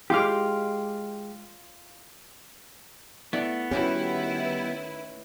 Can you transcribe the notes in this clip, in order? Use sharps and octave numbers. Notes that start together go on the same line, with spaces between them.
G#3 F4 G4 D6 F6
A3 B3 E4 D5
D#3 G3 A3 C#4 E4 F#4 G4 B4